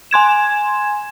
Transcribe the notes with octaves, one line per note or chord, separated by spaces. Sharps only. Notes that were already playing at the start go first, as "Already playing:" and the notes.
G#5 C6 G#6 E7